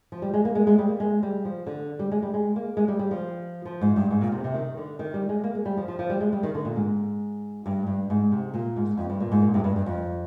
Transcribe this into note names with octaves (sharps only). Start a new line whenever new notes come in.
F3
G3
G#3
A#3
G#3
G#3
G3
A#3
G#3
G3
F3
D3
G3
G#3
G3
G#3
A#3
G#3
G3
G3
F3
F3
G#2
G2
G#2
A#2
C3
C3
D#3
D3
D#3
G3
G#3
A#3
G#3
G3
F3
F3
F3
G3
G#3
G3
D#3
D3
A#2
G#2
G2
G2
G#2
C3
A#2
G#2
F2
G2
A#2
G#2
A#2
G2
G2
G2
F2